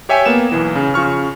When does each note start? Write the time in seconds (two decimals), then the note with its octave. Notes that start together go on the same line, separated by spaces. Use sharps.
0.09 G4 C#5 E5 G5 G#5
0.26 A#3 B3 E7
0.52 B1 E3
0.75 C#3
0.94 C#3 F3 C#6 F6